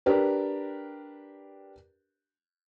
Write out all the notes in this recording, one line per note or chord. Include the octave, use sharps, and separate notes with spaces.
D4 G4 A#4 B4